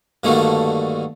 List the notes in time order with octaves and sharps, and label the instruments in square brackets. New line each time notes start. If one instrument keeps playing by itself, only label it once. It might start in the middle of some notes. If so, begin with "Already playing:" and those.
[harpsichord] G2 D3 D#3 A3 A#3 F#4